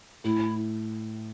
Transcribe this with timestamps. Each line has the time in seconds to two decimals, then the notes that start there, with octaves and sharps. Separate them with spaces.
0.24 A2 E4